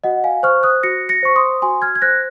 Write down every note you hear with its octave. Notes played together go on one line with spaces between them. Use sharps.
F#4 D#5 F#5
F5 G#5
C5 C#6 F6
D#6 F#6
F#4 A#6 C#7
A#6 C#7
C5 C#6
C6 D#6
F#4 G#5 C6
F6 G#6
G#6
C5 F#6 A#6